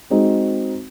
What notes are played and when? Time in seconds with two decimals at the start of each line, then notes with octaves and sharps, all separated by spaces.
0.10 G#3 C4 D#4 F#4